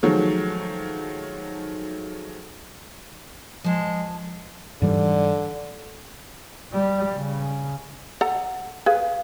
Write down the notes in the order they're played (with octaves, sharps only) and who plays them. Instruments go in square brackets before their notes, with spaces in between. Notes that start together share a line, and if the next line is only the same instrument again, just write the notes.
[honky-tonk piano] D#3 F3 F#3 G#3 A3
[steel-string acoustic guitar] F3 A5 [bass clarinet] G#3
[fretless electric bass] G#2 E3 G3 [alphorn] D3
[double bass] G3
C#3
[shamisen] A4 A#5 [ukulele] F#5
[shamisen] G#4 [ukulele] B4 F5